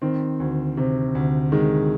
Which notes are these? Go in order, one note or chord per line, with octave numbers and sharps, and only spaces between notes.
D#3 C4
D2
C3
D2
D#3 G#3